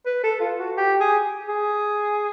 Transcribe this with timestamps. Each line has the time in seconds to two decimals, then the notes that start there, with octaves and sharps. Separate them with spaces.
0.06 B4
0.24 A4
0.41 F4
0.59 F#4
0.77 G4
1.01 G#4
1.49 G#4